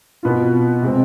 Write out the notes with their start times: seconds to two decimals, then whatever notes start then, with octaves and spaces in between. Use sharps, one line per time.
0.23 B2 B3 F4
0.82 C3 G#3 C4